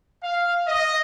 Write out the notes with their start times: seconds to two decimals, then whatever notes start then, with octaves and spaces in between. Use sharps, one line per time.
0.23 F5
0.68 D#5